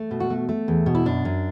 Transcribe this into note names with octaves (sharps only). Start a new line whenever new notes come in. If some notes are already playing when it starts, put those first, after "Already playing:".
Already playing: A3
B2
F#4
A3
A3
E2
B2
E4
F#2 D4
F#2